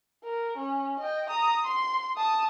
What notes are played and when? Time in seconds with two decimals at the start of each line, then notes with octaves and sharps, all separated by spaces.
0.24 A#4
0.57 C#4
1.00 D#5 G5
1.29 A#5 D#6
1.65 C6
2.17 A5 D#6